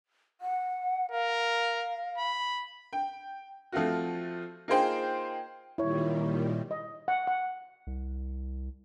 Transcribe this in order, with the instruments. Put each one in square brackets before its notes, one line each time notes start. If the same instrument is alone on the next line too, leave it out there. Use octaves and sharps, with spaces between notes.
[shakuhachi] F#5
[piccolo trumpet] A#4 [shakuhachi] F5
[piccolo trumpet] B5
[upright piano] G5
F3 A3 C4 F4 F#4
A#3 D#4 F4 G#4 C5 G5
[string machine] A#2 D#3 G3 [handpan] E4 C#5
[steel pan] D#5
F#5
F#5
[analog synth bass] C2